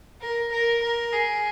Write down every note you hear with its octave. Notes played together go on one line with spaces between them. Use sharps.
A#4
A#4
A#4
G#4